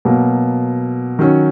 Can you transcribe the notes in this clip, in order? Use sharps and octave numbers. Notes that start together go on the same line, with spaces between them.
B2 F#3 A#3
D#3 F#3 C#4